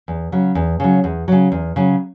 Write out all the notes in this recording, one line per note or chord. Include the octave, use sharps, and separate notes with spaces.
E2
C#3 F#3
E2
C#3 F#3
E2
C#3 F#3
E2
C#3 F#3